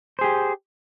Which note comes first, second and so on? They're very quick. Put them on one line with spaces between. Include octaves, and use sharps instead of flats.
C5 G#4 G4